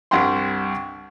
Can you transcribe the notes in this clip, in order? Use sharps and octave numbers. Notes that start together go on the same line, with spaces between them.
C2 G2 F#5 G5 C6